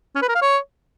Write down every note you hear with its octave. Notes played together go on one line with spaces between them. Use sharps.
C#4
B4
A#4
F5
C#5